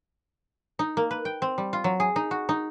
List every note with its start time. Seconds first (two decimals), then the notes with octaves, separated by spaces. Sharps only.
0.79 D#4
0.97 A#3
1.11 B4
1.25 G5
1.42 C4
1.58 G3
1.73 F4
1.84 F#3
2.00 G#4
2.16 D#4
2.31 F#4
2.49 D#4